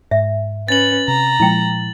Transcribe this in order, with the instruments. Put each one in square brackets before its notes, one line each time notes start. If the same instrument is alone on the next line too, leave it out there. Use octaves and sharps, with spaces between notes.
[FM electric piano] G#2 [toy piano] E5
[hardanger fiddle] C#4 B4 [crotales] A6 F#7
[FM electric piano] C3 [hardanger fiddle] A#5
[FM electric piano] A#2 F3 G#3 [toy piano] E4 G5